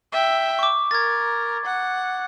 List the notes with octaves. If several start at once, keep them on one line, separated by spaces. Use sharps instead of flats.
E5 G5
C#6 D6
A#4 G#6 A6
F#5